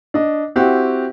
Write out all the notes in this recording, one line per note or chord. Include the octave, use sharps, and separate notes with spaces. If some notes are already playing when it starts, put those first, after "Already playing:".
D4 D#5
C4 E4 F#4 G4